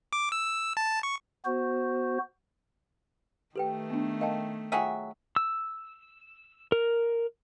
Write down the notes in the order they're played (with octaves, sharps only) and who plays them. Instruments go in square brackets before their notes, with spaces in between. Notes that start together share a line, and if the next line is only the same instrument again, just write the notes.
[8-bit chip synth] D6
E6
E6
A5
C#6
[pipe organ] B3 F#4 C5
[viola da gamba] D#3 A3 [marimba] G4 [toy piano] A4 B4 G5
[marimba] B3 D4
[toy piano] A#4 G5 A5 [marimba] D#5 F5
[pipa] F#3 G#4 E5 [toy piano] F4 G5 G#5
[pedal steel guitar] E6
A#4